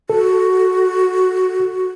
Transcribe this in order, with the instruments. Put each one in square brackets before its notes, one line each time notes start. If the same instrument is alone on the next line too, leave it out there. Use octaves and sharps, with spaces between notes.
[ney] F#4 [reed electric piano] A4